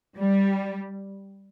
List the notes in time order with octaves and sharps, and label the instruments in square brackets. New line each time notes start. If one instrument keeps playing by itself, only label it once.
[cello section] G3